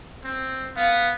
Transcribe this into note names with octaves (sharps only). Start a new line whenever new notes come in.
C4
B3 F5